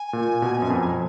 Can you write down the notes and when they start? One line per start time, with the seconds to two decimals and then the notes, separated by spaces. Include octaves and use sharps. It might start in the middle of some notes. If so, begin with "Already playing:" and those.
Already playing: G#5
0.13 A#2
0.42 B2
0.62 F#2
0.70 F2